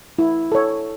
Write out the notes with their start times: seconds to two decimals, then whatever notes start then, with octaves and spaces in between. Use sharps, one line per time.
0.19 E4
0.52 A4 C#5